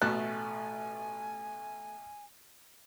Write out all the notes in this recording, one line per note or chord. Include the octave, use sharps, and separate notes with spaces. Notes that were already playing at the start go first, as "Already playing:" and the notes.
A1 B2 A3 G#5 F#6